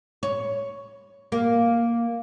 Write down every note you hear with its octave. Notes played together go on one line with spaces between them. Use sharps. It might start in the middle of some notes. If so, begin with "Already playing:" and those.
C#5
A#3